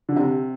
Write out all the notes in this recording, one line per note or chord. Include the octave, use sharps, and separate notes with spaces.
D3
C3